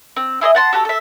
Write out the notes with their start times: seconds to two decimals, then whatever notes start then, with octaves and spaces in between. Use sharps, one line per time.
0.16 C4
0.41 E4 G#4 C#5 D#5
0.55 F#5 A5 C6
0.73 F#4 G4 A4
0.85 A4 E5